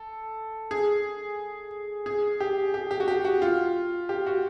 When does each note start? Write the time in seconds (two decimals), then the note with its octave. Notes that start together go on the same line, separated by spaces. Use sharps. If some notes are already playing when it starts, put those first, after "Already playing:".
Already playing: A4
0.71 G#4
2.06 G#4
2.40 G4
2.74 G4
2.91 G4
3.00 F#4
3.08 G4
3.25 F#4
3.42 F4
4.09 G4
4.26 F#4